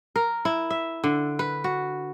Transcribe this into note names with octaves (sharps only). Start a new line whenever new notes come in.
A#4
E4
E5
D3
B4
F#4